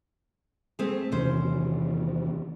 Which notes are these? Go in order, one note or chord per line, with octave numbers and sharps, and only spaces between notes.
A3 C4 G#4
E2 C3 D#3 C#4 C5